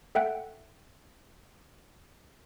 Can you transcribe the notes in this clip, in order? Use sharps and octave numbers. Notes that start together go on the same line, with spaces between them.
A4 E5 F#5 G5 F#6